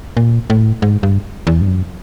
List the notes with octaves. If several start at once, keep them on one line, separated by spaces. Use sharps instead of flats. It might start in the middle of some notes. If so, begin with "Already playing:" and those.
A#2
A2
G#2
G2
E2
G2
F#2